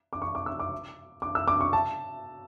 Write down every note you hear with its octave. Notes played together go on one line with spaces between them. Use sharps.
D6
C#6
D6
E6
D6
D6
E6
D6
C#6
A5